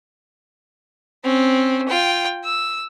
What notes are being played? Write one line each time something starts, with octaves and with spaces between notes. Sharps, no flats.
C4 C#4
F4 G5
E6